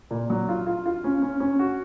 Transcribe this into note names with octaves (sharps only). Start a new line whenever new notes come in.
A#2
F#3
F4
F4
F4
C#4
C#4
C#4
F#4